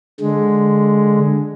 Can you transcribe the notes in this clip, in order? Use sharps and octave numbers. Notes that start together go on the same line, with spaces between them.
D3 G#3